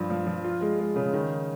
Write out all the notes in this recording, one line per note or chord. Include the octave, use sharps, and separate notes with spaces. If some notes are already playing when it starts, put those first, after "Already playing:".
Already playing: G2 F3
F3
F3
F4
G#3
G#3
C#3
D#3